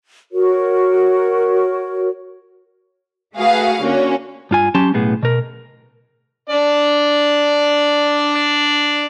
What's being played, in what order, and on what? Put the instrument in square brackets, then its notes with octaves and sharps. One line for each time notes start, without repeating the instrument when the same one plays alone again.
[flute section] F#4 A#4 C#5
[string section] A3 F#4 G#4 B4 F5
D3 A#3 C#4 F#4
[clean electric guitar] G2 F4 G#5
F#3 C#4 G4 A5 C6
B1 A2 B3 G#4
B2 A#4
[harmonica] D4 D5